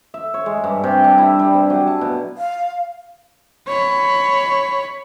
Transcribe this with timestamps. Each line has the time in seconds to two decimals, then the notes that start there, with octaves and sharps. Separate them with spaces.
0.14 E5
0.34 C#5
0.46 G#3
0.64 G2
0.84 C3
1.04 D4
1.18 E4
1.39 G3
1.54 C3
1.70 F#3
1.87 A5
2.01 B2
2.38 F5
3.68 C#5 B5